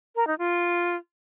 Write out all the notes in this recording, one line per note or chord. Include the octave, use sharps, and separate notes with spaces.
A#4
D#4
F4